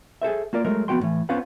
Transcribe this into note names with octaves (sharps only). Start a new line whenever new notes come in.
G#4 A4 C5 E5
A#3 F4 A#4 D5
F#3 G#3 A3 A#4 D#5
F3 B3 F#4 G5 C6
B1 A2 E3
B3 C#4 F4 C5 F5 F#5